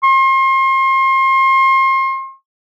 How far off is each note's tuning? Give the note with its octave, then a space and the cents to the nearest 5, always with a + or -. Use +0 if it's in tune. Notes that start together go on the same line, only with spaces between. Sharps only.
C6 +35